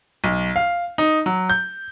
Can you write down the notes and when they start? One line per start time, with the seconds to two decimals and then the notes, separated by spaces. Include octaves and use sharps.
0.24 B1
0.56 F5
0.98 D#4
1.26 F#3
1.49 G6